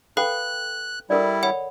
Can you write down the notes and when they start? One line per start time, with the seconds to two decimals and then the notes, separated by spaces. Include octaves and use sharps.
0.17 A4 B4 F5 G5 B5 F#6
1.10 G3 E4 A4 A#4 D5
1.43 C#5 F#5 B5